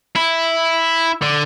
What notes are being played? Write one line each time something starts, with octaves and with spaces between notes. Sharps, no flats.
E4
D3